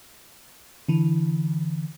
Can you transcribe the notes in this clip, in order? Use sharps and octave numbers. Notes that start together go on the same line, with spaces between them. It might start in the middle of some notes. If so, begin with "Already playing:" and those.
D3 E3